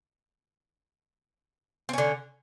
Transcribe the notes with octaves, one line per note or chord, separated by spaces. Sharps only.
D3 C4 C#4